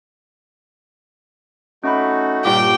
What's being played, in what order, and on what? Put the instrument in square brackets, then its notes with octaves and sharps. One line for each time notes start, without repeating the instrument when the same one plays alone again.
[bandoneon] A3 D#4 F#4 [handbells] C#4 B5
[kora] G2 A#2 C#4 [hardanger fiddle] G5 [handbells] D6